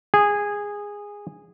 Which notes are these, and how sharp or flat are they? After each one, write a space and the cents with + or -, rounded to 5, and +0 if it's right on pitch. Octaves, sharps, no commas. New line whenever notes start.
G#4 -15